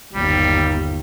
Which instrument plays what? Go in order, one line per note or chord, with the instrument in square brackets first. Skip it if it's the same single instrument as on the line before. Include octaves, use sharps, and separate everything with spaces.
[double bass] G1 D#2 [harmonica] G3